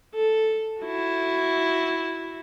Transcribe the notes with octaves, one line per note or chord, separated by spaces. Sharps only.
A4
E4 F#4